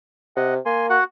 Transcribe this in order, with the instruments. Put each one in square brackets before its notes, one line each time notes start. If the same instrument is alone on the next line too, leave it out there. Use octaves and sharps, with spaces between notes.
[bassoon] C3 [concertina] D#5 F#5
[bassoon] A#3 [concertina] G#5 C6
[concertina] F#4 F#5